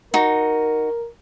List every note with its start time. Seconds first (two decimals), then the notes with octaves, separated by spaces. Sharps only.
0.14 D#4 F#4 A#4